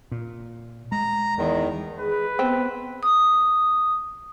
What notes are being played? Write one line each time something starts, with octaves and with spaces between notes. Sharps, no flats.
A#2
G#3 A#5
E2 D#3
G#4 B4
B3 C4
D#6